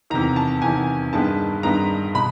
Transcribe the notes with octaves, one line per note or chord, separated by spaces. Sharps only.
E2 C3 D#3 A#5
A5
E2 C3 D#3 G#5
G2 D#3 G#3 B3 A5
G2 D#3 G#3 B3 A#5
B2 B5